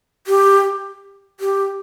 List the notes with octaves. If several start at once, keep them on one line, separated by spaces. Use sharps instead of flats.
G4
G4